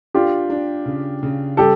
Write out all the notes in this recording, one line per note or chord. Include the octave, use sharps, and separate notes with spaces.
D4 F4 G4
D4
C#3
C#3
G3 G4 A4